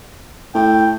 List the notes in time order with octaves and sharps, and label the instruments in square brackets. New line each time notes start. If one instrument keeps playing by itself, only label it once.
[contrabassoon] A2 [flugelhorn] G5